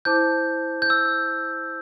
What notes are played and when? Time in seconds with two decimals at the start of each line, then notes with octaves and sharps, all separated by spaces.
0.05 E4 C5 A5 D6 G6
0.82 G6
0.90 E6